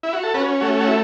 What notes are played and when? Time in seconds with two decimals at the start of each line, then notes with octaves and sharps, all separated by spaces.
0.03 E4
0.13 F#4
0.23 A4
0.34 C#4 F#4 B4
0.61 A3 F#4
0.80 F#4
0.88 E4